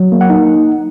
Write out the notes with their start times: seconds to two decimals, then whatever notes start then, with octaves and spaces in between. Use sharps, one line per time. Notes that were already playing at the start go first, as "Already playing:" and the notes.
Already playing: F#3
0.12 A#3
0.21 F#5
0.30 D#4